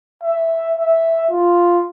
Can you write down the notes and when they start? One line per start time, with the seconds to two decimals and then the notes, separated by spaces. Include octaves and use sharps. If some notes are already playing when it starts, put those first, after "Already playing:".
0.23 E5
0.76 E5
1.30 F4